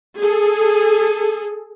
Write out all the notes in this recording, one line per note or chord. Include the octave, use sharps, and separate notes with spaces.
G#4 A4